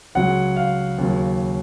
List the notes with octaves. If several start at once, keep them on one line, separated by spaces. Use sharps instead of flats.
C#2 C#3 F#3 F#5
F5
D#2 C#3 F#3